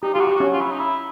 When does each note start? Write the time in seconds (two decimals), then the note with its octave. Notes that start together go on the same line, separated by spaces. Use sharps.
0.03 D#4 G4
0.14 F4 G4
0.19 F#4
0.27 G4
0.35 C#4 F#4
0.52 F4
0.61 E4
0.70 D#4
0.79 E4